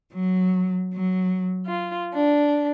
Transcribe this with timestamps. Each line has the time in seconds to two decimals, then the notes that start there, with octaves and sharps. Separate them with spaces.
0.13 F#3
0.93 F#3
1.67 F4
2.13 D4